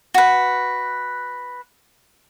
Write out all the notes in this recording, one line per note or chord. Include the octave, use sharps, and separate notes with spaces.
F#4 B4